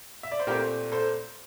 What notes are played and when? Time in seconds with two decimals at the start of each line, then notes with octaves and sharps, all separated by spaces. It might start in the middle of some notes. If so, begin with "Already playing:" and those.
0.23 E5
0.31 D5
0.40 C5
0.47 A#2 A3 C4 G4 A#4
0.92 A4 C5